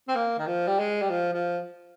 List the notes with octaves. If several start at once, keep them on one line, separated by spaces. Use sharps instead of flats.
C4
A#3
D#3
F3
G3
G#3
G3
F3
F3